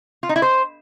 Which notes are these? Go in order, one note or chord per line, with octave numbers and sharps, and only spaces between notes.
F4
D#4
E4
C5